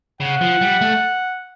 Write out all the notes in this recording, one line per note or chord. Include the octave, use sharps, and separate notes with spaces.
C#3 F#5
F3
G3
A3